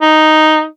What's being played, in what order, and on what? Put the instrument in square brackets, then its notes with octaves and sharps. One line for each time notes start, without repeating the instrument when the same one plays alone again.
[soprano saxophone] D#4